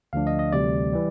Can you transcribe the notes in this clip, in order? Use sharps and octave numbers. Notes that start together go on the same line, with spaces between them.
D2 D3 F3 A3 D4 F5
D#5
D#5
D2 C3 E3 G3 D5
E3 G3